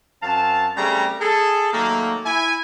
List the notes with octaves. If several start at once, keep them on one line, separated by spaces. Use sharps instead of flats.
F#2 C4 F5 A5
C#3 G3 A3 C4 G#4 A#5
G#4 A4
D#3 F#3 A3 A#3
E4 G#5